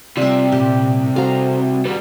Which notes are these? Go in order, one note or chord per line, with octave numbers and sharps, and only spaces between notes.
C2 C3 G3 F4 E5
A#2 G4
F#4 A4 C5 F5 A#5
D#2 G3 G#4 B4